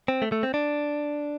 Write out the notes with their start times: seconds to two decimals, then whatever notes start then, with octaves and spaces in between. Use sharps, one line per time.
0.08 C4
0.22 A3
0.32 A3
0.43 C4
0.54 D4